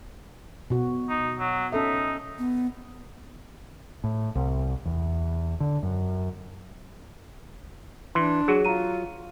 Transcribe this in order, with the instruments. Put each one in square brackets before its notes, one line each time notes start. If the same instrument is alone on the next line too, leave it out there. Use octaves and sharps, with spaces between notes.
[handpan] B2 F#4
[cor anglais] D#4
F#3
[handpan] C#4 A4 E5 [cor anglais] D#4
[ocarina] B3
[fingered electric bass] A2
C2
E2
D3
F#2
[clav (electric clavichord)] E3 [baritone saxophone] D4 [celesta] C6
[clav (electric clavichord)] F#3 F#4 [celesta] G#4
[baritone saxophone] F4 [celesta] A#5 D#7